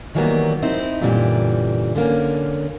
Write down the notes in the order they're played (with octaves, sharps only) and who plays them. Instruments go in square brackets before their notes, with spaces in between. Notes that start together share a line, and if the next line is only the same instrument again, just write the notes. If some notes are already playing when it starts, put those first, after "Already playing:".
[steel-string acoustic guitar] D#3 E3 F#3 G3 A#3 B3
C4 D#4 E4
F#2 A#2 D3 E3 G3
D3 A#3 C#4